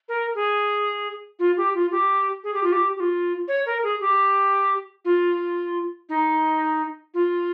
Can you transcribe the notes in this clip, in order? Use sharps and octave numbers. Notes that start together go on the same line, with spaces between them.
A#4
G#4
F4
G4
F4
G4
G#4
G4
F4
G4
G4
F4
C#5
A#4
G#4
G4
F4
D#4
F4